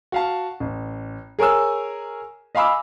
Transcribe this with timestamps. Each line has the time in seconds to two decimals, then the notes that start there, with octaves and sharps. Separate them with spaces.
0.12 F#4 F5 A5
0.60 A1
1.39 G#4 A#4 C#5 G#5 E6
2.55 D#5 F5 G#5 B5 D6 E6